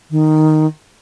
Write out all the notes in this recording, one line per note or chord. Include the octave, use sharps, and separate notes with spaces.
D#3